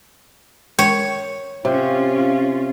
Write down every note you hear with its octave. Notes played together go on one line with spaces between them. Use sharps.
G#3 C#5
C3 C#4 F4